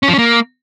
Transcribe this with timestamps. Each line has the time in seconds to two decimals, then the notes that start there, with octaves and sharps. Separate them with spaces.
0.03 C#4
0.08 F3
0.13 C#4
0.19 A#3